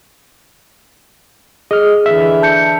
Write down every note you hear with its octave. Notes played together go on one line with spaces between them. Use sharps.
G#4 D#5 F6
D3 E3 E5
A5 G6 C#7